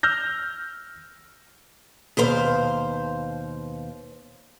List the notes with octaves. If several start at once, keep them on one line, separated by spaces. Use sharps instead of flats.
E6 F6 G6 A#6
D#2 B2 C5 F5